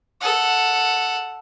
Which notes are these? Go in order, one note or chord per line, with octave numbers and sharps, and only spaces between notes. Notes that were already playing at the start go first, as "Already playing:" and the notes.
A4 F#5